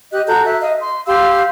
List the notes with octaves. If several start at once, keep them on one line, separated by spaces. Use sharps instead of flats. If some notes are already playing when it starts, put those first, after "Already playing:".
G4 D#5 F#6
F#4 A4 A#5 G6
E5 F#6
D#5 F5
C6
G4 F5 C6 E6